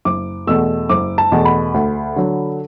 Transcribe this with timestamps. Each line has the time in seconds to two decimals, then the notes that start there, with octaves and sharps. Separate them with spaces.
0.05 F#1 D6
0.47 E2 B2 A3 E6
0.89 F#1 D6
1.18 A5
1.32 E2 B2 A3
1.45 B5
1.74 D2
2.16 D3 F#3